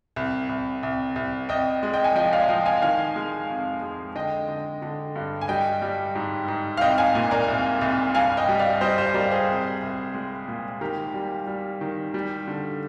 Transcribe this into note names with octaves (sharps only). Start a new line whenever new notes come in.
C2
C2
C2
C2
C2 D#5 G5
G#3
D#5 G5
G#5
F3 D#5 G5
D5 F5
F3 D#5 G5
F5 G#5
D#3 F5 G#5
G#3
F2
G#3
D3 D#5 G5
D3
D3
G2
G#5
G3 D#5 G5
G3
G#2
G#2
F5
C2 D#5 G5
F5 G#5
A#2
A#4 D5
C2
C2
G2 F5 G#5
D#5 G5
G3
D5 F5
G3 C5 D#5
C5 D#5
G3 A#4 D5
G#4 C5
C2
C2
G#3
A#2
D#3 G4 A#4
G3
G3
D#3
G3
D3